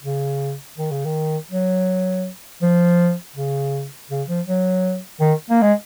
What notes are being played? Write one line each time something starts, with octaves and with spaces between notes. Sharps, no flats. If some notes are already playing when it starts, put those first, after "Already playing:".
C#3
D#3
C#3
D#3
F#3
F3
C#3
C#3
F3
F#3
D#3
A#3
G#3